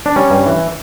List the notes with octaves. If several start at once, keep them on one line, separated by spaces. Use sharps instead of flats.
D4
G3 C#4
G2
E3